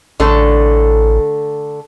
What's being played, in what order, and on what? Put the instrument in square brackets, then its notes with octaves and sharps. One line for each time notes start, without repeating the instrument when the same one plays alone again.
[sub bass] A1 [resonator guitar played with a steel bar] D3 A3 A4